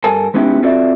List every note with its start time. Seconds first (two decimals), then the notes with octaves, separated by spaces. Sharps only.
0.04 G2 A4 A#4 G#5 A5
0.34 G#3 B3 C#4 D#4 E4 G4
0.62 C4 F4 F#4 A4 D5 E5